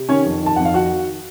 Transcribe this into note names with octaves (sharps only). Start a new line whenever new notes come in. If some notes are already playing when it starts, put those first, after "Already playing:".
Already playing: C3
D#3 C#4 C#5
F2
D#3 A5
F2 F#5
F5
D#3 F#4 F#5